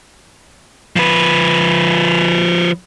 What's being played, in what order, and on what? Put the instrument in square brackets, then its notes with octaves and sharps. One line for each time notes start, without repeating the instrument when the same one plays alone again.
[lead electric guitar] F3 B4